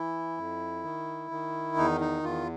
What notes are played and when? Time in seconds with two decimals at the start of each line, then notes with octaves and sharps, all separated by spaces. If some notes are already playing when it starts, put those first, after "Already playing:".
Already playing: E3 E4
0.38 F2
0.84 D#3
1.31 D#3
1.77 E2 D#4
2.01 D#4
2.23 E2 F4